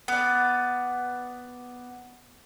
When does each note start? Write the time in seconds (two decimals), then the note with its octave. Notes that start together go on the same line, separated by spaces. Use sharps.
0.08 B3 D5